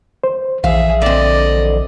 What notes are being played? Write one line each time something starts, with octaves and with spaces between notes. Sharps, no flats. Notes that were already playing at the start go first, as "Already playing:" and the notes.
C5
A#1 E3 G#4 E5 F5
D3 C4 D5 D#5